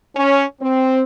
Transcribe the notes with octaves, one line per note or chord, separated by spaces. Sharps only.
C#4
C4